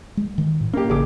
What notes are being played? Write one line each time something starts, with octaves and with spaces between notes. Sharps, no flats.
G#3
D#3
A2
A#3 C#4 G4
A1 C#3 G4 G#4 D6